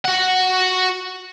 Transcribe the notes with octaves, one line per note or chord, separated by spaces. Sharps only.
F#4 F#5